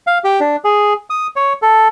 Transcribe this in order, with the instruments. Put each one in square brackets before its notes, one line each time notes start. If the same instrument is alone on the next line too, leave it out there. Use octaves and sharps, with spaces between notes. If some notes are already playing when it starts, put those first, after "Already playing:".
[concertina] F5
G4
D4
G#4
D#6
C#5
A4